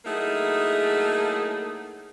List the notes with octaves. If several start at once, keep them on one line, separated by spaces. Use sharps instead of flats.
F#3 A3 A#3 D#4 E4 G#4